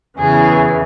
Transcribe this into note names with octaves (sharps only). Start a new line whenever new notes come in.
E2 C#3 E3 G#4